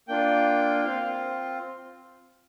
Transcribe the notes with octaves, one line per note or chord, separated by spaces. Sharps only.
A#3 D4 F4 G5
G5
C4 F4 F5